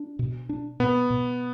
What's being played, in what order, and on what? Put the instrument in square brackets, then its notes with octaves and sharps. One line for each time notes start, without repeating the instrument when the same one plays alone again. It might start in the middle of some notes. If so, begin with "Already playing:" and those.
Already playing: [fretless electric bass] D4
B2
D4
[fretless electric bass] B2 [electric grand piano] B3
[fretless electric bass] B2